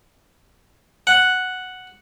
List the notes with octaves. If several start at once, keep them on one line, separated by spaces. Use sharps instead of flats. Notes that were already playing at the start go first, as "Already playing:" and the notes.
F#5